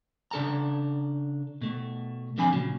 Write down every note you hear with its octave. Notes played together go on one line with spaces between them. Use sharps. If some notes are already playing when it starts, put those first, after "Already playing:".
C#3 D4 A4 A5 A#5
B2 A3
D3 F3 C4 D4 G#5 B5
A#2 C#3 F#3